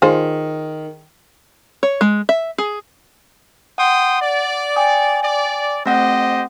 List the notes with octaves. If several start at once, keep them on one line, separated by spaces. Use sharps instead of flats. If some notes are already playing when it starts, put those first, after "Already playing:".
D#3 F4 G#4 C5
C#5
G#3
E5
G#4
F#5 G5 C6 D#6
D5
G5 G#5 D#6
D5
A3 C4 G4 C5 D#5 F#5